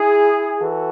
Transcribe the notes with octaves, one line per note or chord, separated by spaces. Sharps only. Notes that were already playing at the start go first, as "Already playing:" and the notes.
Already playing: E4 G#4
E3 F#4 A4